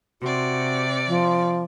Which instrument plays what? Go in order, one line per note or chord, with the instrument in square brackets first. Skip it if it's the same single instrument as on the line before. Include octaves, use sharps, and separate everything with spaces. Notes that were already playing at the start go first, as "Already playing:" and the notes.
[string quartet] C3 D5 [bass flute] F#4
[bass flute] F3